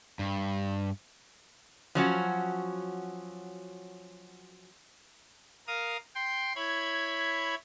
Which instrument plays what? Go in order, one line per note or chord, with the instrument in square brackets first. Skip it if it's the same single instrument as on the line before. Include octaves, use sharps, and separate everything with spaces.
[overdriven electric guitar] G2
[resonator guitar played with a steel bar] F3 F#3 C#4 F#4
[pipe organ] A#4 F5 D#6
G5 C6
E4 C#5 B5 G#6